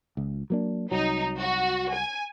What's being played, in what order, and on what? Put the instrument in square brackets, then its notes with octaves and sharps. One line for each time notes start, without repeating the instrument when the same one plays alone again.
[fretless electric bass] C#2
F#3 A#3 D4
[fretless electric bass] C2 F#3 [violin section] D#4
[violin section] F#4
G#5